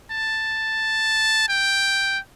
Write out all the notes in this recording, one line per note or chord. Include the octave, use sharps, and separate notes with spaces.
A5
G5